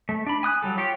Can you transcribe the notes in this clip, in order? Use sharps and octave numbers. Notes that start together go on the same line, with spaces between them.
A3
D4 B5
G#5 D#6 F#6
F#3 G3 A4
F4 G4 C#5 G5